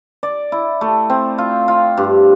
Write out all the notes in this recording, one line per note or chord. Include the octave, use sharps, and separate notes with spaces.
D5
E4
A3
C4
F4
F4
G2